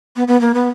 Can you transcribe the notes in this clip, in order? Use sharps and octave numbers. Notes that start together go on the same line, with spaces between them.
B3
B3
A#3
B3